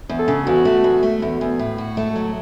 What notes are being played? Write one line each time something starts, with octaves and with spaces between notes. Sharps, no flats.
E2
A4
C#3
E2 F#4
A3
E2
A3
E2
E2
A2
F#4
A3
F#3